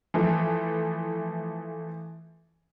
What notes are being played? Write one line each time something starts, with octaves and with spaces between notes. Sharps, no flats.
E3 F3 A3